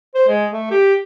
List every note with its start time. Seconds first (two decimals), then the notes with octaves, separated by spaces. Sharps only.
0.15 C5
0.28 G#3
0.52 A3
0.71 G4